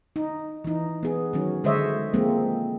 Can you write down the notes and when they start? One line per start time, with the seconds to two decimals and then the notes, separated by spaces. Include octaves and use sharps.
0.16 D#4
0.64 E3 D#4
1.03 B3 G#4
1.33 D#3 F#3 C#4
1.64 D3 G#3 C5 C#5 D#5 E5
2.13 F3 G#3 A#3 C4